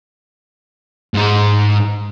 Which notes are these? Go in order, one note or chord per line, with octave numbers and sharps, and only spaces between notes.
G#2 G#3